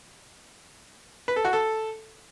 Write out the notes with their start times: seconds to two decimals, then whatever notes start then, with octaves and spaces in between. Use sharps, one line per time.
1.28 B4
1.36 A4
1.45 F#4
1.53 A4